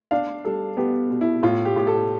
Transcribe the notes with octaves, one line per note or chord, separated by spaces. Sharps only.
D4 F5
G3 A4
B3 G4
B2
E4
A2 F4
G4
A2 G4
A4